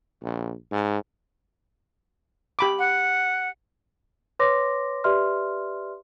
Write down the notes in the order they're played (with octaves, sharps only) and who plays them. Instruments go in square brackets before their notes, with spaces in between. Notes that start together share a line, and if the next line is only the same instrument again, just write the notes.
[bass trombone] A#1
G#2
[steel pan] G4 B5 D6
[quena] F#5
[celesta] B4 C#5 C6 D6 A#6
G4 B4 D5 E5 C6 F6